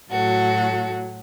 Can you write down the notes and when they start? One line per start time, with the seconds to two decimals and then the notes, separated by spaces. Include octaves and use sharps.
0.11 A2 F#3 F#4 A4